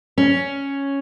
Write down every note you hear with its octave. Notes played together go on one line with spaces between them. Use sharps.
C#4